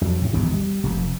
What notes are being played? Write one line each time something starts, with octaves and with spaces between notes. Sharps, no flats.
F2 F#3
A2 C3
G#1 E2 G2 B2
G3
F1 F2